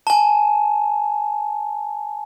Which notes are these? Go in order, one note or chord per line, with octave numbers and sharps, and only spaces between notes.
G#5 A5